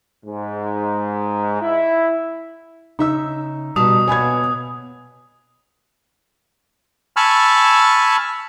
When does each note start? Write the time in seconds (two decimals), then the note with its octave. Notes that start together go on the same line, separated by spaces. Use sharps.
0.24 G#2
1.61 E4
2.99 C#3 D#4 E5 E6
3.76 B2 G3 F#4 A5 D#6
4.08 A#3 B3 C#5 G#5 B5 G#6
7.16 G#5 A5 B5 C#6 E6 F6